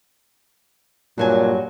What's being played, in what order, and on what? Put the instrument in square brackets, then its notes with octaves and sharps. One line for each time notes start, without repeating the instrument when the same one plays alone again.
[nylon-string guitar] G2 F#3 G#5 [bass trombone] A#2